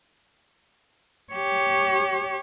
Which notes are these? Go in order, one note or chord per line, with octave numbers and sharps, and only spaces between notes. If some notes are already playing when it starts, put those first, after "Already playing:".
G4 C#5